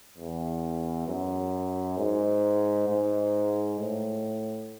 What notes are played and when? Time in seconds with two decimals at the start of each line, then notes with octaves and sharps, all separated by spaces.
0.18 E2
1.08 F#2
1.98 G#2
2.89 G#2
3.79 A2